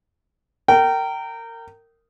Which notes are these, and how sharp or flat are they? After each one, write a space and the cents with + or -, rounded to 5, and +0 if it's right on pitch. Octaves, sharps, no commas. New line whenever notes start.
A#4 -25 G5 -25